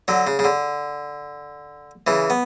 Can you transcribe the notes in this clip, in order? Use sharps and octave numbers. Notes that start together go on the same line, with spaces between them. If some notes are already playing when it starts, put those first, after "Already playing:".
D3 F#3
C#3
C#3
D3
C#3 E3
B3